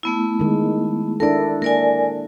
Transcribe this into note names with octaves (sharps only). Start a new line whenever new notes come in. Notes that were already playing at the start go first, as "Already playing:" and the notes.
A3 B3 E4
D#3 G#3
D4 E4 A4 A#4 D5
A#3 A#4 D5 G#5